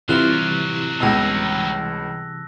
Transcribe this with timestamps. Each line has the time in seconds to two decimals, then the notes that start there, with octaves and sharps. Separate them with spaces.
0.09 C3 E3 F#3 G3 D4 F4 F#6 G7
1.00 C#2 B2 A5 E6 A#6